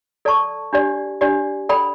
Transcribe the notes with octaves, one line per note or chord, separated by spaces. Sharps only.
A4 D5 A5 C#6
D4 G4 D5
D4 G4 D5
A4 D5 G5 B5